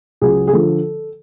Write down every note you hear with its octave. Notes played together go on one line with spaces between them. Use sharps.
C#2 C#3 F#3 G#4
G#4
D3 F3 A4